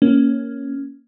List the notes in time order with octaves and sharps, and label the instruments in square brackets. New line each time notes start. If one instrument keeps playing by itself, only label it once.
[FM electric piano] A#3 C#4